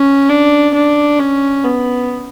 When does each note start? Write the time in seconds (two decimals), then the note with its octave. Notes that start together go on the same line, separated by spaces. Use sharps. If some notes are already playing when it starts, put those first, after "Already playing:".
Already playing: C#4
0.29 D4
0.74 D4
1.19 C#4
1.64 B3